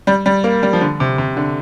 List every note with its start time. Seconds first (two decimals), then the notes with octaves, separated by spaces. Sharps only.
0.07 G3
0.26 G3
0.44 A#3
0.63 G3
0.73 F3
0.81 D3
1.00 C3
1.18 C3
1.37 D3